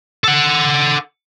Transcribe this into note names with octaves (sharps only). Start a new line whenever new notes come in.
A4 F#5